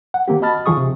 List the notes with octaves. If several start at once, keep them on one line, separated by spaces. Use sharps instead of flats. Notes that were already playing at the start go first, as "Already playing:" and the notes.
F#5
D#3 A#3 C4 G4
F#4 D#5 A5 B5 F6 A6
D#2 D#3 F3 G#4 C#6 D#6
C3